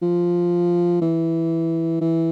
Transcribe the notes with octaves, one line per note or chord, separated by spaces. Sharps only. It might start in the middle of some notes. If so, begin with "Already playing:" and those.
F3
E3
E3